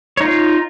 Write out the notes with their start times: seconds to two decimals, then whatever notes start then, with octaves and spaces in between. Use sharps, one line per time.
0.17 C#5
0.21 D#4
0.24 F4